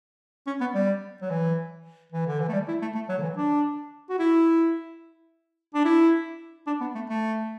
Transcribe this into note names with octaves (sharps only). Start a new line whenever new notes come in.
C#4
B3
G3
F#3
E3
E3
D3
E3
A3
G3
E4
A3
A3
F#3
D3
E3
D4
F#4
E4
D4
E4
D4
B3
A3
A3